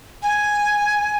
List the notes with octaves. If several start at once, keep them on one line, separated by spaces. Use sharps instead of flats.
G#5